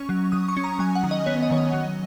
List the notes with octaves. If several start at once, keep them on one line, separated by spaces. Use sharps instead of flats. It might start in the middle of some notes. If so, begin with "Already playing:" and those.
Already playing: C#4 C#6
F#3
F#3 D#6
C#6
C#4
A#5
F#3 G#5
F#5
D#3
D#5
B3 C#5
D#5
D#3 C#5
D#5
F#3